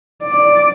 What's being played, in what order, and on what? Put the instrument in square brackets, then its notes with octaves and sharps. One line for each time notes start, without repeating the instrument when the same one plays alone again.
[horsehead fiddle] D5